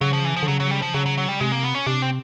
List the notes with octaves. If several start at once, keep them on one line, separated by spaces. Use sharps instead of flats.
C#3 F#3
F3
E3
F3
D3
C#3 F#3
F#3
G3
F3
C#3 F#3
F#3
F#3
G3
C3 G#3
A#3
B3
C#4
C3 D4
C4